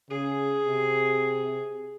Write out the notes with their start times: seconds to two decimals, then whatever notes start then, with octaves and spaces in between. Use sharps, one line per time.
0.10 C#3 G#4
0.64 C3